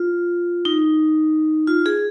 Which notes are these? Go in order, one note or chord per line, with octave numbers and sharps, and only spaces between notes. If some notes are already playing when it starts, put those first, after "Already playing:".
Already playing: F4
D#4
F4
G#4